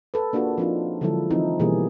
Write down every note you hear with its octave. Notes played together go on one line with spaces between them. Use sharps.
A4 B4
A#3 D4 F4 F#4 G#4 A4
F3 C4 D4 D#4 F4
D3 F3 F#3 G#3 E4 A4
E3 F3 C4 D#4 E4
B2 E3 G3 A#3 G4 G#4